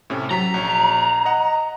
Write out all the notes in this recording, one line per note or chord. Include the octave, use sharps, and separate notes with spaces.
A2 C3 C#4
F#3 A#5 B6
A#1 C#5
D#5 F#5